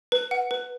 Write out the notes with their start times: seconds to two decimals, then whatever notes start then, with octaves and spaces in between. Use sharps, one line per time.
0.12 B4
0.31 F#5
0.51 B4